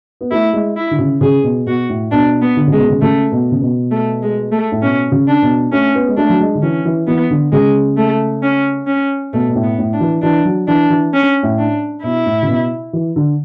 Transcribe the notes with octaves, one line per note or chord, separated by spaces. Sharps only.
B3
A3 E4
G#3
E4
D3
C#3
C#3 G#4
B2
B2 F#4
A2
B2 D4
B3
D3
C#3 G#3
B2
C#3
C#3 A3
B2
C#3
B2
A3
G#3
A3
A2
B2 C#4
C#3
D4
B2
A3 C#4
B3
G#3
A3 D4
F#3
G#3
D3
E3 C#4
E3
E3 B3
D3
C#3 G#3
A3
C#4
C#4
B2 A3
B2
A2
B3
A2
D4
E3
E3 D4
F#3
E3 D4
E3
C#4
A2
D4
B2 E4
A2
C#3
B2
E3
D3